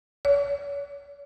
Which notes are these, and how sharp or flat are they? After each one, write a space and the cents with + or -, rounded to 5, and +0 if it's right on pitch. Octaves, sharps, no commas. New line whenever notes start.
C#5 +40